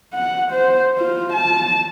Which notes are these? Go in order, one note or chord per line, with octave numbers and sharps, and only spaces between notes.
F#5
C5
F4
A5